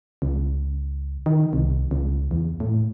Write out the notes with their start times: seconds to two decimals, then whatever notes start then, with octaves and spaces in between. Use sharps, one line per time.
0.22 C#2
1.26 D#3
1.53 C2
1.91 C#2
2.31 E2
2.60 A2